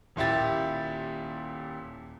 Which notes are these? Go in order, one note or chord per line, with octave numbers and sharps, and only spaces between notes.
D#1 A#2 E4 G4 A6